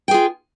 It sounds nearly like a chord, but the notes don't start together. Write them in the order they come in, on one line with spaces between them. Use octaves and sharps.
G5 G#4 F4